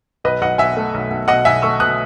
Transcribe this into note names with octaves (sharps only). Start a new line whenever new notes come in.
B1 B4 D#5
B1 D#5 F#5
B1 E5 G#5
A3
B1
B1
B2 D#5 F#5
B1 E5 G#5
A3 C#6 E6
B2 D#6 F#6